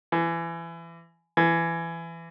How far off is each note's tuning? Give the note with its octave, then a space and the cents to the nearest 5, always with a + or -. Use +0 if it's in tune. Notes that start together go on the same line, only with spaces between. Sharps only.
E3 +25
E3 +20